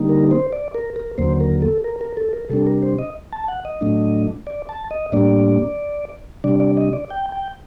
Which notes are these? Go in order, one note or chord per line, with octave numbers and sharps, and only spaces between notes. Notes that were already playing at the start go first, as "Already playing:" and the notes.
Already playing: D3 G3 A#3 D#4
A#4
C5
D5
A#4
A#4
D#2 D3 F#3 A#3 C5
A#4
A4
A#4
A#4
A4
A#4
C3 G3 D4 A4
A#4
C5
D#5
A5
F#5
D#5
A2 F#3 A3 D4
D5
A5
D#5
A2 G3 A#3 D4 D5
C3 G3 D4 D5
D5
D#5
D5
G5
G5